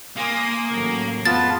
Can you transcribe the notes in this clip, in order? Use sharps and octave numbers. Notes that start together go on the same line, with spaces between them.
A#3 G#5 C6 D#6
A1 F#3 A3
F2 G#3 B3 F4 A5 A6